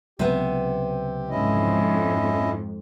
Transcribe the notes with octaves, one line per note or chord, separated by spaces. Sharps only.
C#2 C3 F#3 B3 G4
F2 G#2 C#4 E4 D#5